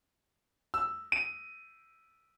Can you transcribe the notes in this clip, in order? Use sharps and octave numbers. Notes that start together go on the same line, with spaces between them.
E6
D#7